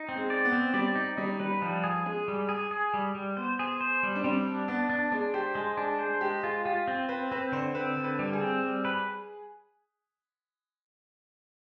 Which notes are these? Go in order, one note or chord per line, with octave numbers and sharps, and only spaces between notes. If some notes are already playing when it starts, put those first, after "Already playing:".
Already playing: D#4
C4
G#3
D5
B3
C4
G3 D5
D#4
G3 D#4
G3 B4
F3 G3
G#4
G#3 G#4
G3
G#4
G#4
G3
G3
B3 C5
G#4
C5
G3
D4
G3 C4
D4
B3 D4
D4
G#3 D4
G4 C5
G#3 G#4
D4 G#4
G#4 C5
G#3 G4
F4 G#4
F4 G4
C4
C4 B4
C4 B4
D3 C5
C4 B4
D3
B4
G3
G#4
C4
G3
B4